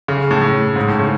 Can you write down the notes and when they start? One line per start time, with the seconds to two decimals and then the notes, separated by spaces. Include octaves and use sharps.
0.08 C#3
0.31 A2
0.42 A2
0.76 G#2
0.88 A2
0.99 C#3